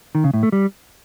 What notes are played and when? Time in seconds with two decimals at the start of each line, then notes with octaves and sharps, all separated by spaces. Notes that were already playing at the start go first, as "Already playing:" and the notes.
0.15 D#3
0.24 C#3
0.34 A2
0.43 A3
0.52 G3